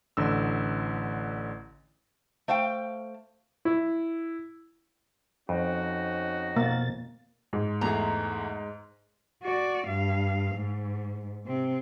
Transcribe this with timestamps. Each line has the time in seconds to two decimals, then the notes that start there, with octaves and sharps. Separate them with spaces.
0.17 A1 D3 E6
2.48 A3 C5 F5 G5
3.65 E4
5.49 F2 C#4 D#4 F#4
6.56 B2 A#3 A6
7.53 G#2 G#3
7.81 E2 A3 G#4 A#5
9.43 F#4 D5
9.87 G2 F5
10.55 G#2
11.45 C3 C4